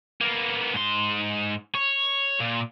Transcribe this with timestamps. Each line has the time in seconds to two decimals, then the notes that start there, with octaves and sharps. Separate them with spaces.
0.21 A#3 B3
0.74 G#2 C6
1.75 C#5
2.40 A#2